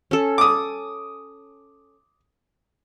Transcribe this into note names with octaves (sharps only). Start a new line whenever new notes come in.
C#4 A4
D6 D#6